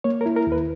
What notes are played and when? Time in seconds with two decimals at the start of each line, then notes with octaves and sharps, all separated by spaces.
0.04 A#3 C#5
0.21 A#4
0.26 E4
0.36 A#4
0.47 D#2 B4